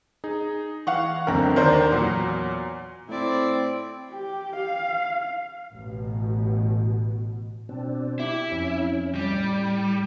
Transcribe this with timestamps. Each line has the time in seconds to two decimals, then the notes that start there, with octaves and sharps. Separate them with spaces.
0.24 D#4 G#4
0.87 E3 F5 F#5 C#6
1.27 C#2 F#2 D3 C4 A#4
1.56 D#2 D3 D#3 A#4 C5 D5
1.91 E2 A#2 F#3 C#5 A#5 C6
3.09 A2 C4 E4 D5
4.10 G4
4.56 F5
5.73 A1 B2
7.69 B2 C4 D4
8.20 E4 G4
8.52 F2 C#4
9.15 G3
9.31 A2